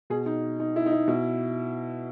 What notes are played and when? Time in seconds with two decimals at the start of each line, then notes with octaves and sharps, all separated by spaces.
0.10 B2 G#4
0.26 D#4
0.60 D#4
0.76 E4
0.86 D#4
0.92 E4
1.08 B2 E4